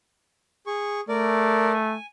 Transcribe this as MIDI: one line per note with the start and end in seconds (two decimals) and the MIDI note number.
0.67 1.00 68
0.67 1.00 85
1.09 1.97 57
1.09 1.72 70
1.09 1.72 74
1.74 2.06 80